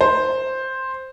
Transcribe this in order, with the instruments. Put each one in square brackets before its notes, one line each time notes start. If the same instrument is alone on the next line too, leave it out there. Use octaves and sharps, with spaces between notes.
[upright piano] C5